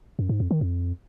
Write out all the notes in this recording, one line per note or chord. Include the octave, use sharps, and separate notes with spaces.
F#2
G#2
F2
D#3
F2